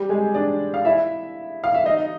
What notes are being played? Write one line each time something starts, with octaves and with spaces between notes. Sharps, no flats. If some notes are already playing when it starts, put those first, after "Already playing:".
Already playing: G3 G4
G#3 G#4
D4 D5
F5
E4 E5
F5
E5
D#4 D#5